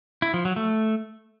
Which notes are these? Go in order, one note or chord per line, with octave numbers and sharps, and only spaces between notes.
E4
F3
F#3
A3